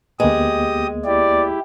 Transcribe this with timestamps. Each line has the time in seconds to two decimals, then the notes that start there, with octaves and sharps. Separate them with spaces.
0.20 D2 G#3 A#3 B3 G4 D#5 D#6
1.05 E4 G4 D5